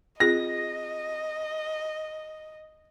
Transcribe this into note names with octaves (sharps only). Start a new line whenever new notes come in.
C4 F4 G#4 D#5 A#6